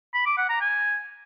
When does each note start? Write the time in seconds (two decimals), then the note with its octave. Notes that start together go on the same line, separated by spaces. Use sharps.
0.14 B5
0.26 D6
0.37 F#5
0.49 A#5
0.61 G#5